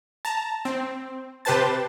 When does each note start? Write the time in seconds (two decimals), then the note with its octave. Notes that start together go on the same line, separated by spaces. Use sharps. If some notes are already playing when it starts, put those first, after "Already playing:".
0.25 A5 A#5
0.65 C4
1.45 C3 G4 B4 C5 A5 A6